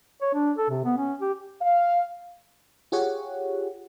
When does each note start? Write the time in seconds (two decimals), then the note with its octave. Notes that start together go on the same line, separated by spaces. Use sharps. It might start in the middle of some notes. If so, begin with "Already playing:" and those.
0.22 C#5
0.34 D4
0.58 A4
0.69 C3
0.85 B3
0.97 C#4
1.21 G4
1.61 F5
2.92 F4 G4 G#4 C#5 F#5